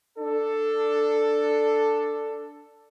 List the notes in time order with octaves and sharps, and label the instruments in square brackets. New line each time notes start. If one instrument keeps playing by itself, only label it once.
[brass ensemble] D4 A4